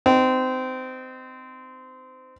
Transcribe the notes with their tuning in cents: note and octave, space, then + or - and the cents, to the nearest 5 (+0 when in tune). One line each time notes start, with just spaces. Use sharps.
C4 -25 D#4 -15